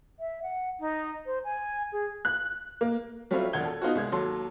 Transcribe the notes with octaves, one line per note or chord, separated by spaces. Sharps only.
E5
F#5
D#4
C5
G#5
G#4
F#6
A#3
F#3 G3 A3 C4 F4 C#5
E1 A#1 F#5 G#6 G7
A4
B3 D#4 F4 F#4
C2 G#3 G#6
D#2 F#3 A4 C6